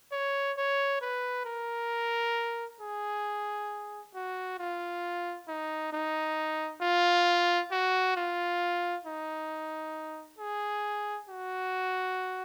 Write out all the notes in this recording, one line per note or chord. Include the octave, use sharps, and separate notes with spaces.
C#5
C#5
B4
A#4
G#4
F#4
F4
D#4
D#4
F4
F#4
F4
D#4
G#4
F#4